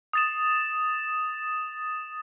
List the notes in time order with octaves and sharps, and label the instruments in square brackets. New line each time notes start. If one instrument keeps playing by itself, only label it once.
[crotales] D#6 A6 E7